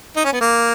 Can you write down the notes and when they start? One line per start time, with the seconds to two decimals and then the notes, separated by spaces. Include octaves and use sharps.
0.17 D#4
0.25 C#4
0.33 B3
0.41 A#3